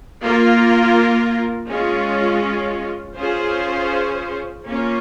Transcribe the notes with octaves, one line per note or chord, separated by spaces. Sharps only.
A#3 F4 A#4
G#3 C#4 F4
C#4 F4 G#4 C5
A#3 C#4 F4